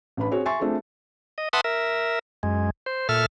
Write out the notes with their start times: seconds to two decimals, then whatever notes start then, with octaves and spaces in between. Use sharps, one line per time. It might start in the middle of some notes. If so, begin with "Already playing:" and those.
0.17 A1 D4 B4 B5
0.31 C4 F#4 G#4 C#5
0.46 E5 G#5 C6 C#6 A6
0.60 A3 C4 D4 F4 G#4
1.38 D#5
1.53 B4 E5 F#5 A5 C6 D#6
1.64 A#4 E5
2.43 F#2 G#3
2.86 C5
3.09 A#2 A4 E5 F6